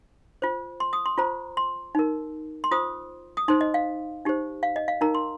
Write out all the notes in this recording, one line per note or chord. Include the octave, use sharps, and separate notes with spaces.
F4 C5
C6
D#6
C6
F4 C5 A#5
C6
D#4 A#4
C6
F4 C5 D#6
D#6
D#4 C5 C6
D#5
F5
D#4 G4 C5
F5
D#5
F5
D#4 A#4 A#5
C6